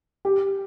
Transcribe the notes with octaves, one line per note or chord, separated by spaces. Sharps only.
G4